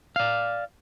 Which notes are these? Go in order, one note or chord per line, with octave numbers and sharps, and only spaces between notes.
D5 F5